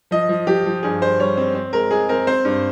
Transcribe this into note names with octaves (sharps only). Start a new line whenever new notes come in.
F3 D#5
F3
F3 G4
F3
G2 G#4
G2 C5
G3 C#5
C4
C4
G#3 A#4
G#3 G#4
C4 A#4
C4 C5
G2